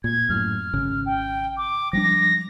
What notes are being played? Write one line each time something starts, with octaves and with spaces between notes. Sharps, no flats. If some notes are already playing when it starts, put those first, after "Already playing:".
A#2 G#6
F#2 A2 F6
G#1 C#3
G5
D6
F3 G3 D4 A#6